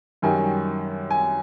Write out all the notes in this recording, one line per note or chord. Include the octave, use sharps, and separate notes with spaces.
F#2 D#3 G3 G#5
G#5